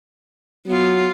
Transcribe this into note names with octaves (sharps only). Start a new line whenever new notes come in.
F#3 B3 F4